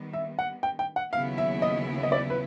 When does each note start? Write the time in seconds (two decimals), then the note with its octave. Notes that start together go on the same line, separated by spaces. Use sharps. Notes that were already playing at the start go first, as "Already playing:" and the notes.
Already playing: D#3 G3 B3
0.13 E5
0.39 F#5
0.63 G5
0.79 G5
0.96 F#5
1.12 D#2 C#3 F#3 B3 E4 F5
1.38 E5
1.62 D#5
2.03 D#5
2.12 D5
2.30 B4